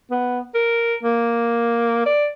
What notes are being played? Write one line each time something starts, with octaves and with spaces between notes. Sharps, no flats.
B3
A#4
A#3
D5